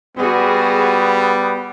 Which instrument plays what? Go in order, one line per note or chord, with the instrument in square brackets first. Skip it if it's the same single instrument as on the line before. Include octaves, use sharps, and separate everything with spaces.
[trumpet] G3 [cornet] B3 [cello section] F#4 G#4